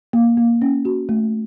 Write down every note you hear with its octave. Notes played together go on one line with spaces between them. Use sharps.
A#3
A#3
C#4
F#4
A3